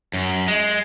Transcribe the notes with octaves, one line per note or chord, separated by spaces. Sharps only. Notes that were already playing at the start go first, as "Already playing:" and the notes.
F#2
G#3